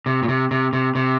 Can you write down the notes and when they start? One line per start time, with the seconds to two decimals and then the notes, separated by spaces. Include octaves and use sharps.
0.06 C3
0.23 A#2
0.28 C3
0.51 C3
0.73 C3
0.95 C3